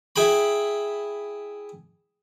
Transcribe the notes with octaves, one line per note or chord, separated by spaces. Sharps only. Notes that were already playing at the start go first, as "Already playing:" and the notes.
E4 G#4 G5 B5